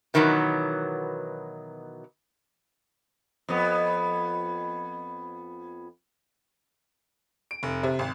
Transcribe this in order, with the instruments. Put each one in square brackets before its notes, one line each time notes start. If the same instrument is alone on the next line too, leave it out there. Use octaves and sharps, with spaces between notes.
[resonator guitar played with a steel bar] B2 D#3 E3 F#3 B3
[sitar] F2 B3
[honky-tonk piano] D7
F1
C3
G#1